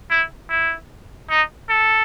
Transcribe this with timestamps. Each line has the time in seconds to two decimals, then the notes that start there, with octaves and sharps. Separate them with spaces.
0.11 E4
0.50 E4
1.30 D#4
1.70 A4